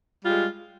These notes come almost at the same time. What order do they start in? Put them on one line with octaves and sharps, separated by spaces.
G3 F4 G#3